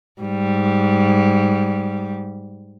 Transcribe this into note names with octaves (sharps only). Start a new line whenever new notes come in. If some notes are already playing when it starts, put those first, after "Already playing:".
G#2 G3